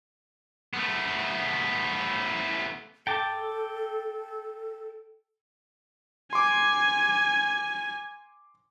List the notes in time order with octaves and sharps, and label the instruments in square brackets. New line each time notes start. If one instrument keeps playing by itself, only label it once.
[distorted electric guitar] A3 B3
[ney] A4 [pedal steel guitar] G5 A5 D6
[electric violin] G#5 [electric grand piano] C6 D6